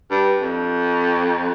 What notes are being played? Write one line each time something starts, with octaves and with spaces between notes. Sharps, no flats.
G2
F2